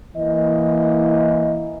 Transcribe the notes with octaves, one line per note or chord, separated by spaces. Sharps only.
E3 A#3 D#5